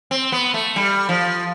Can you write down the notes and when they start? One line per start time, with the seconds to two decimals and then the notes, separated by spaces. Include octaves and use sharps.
0.11 C4
0.32 B3
0.54 A3
0.76 G3
1.09 F3